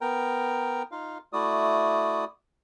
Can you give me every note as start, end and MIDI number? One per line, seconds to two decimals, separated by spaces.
0.01 0.83 59
0.01 0.83 70
0.01 0.83 79
0.01 0.83 82
0.92 1.18 63
0.92 1.18 65
0.92 1.18 77
1.33 2.25 57
1.33 2.25 64
1.33 2.25 66
1.33 2.25 74
1.33 2.25 87